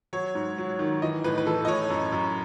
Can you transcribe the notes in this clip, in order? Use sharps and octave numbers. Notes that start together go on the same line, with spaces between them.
F#3 C#5
G#2
F#3
D#3
E3 D#5
A2 B4
B4
E3 A4
D#5
A2 C#5
F#2
F#2